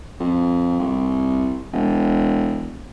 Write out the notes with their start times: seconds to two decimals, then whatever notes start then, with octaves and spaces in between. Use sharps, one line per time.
0.20 F2
0.80 C2
1.73 E1